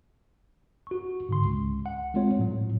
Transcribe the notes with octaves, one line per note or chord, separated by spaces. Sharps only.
F#4 C#6
G#2 D3 C6
C#2
F#5
G#3 A3 C4 F4 C#5
A2 F#3